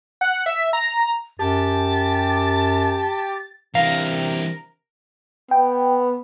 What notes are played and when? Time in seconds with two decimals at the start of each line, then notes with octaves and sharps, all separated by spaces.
0.21 F#5
0.46 E5
0.73 A#5
1.39 F#2 G4 A5 A6
3.75 C3 E3 D4 A#4 F5
5.51 B3 G5